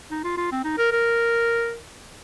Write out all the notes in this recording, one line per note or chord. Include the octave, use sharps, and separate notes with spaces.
D#4
F4
F4
C4
D#4
A#4
A#4